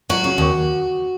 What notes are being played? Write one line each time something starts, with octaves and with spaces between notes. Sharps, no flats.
F#3 F#4
C#3
D#2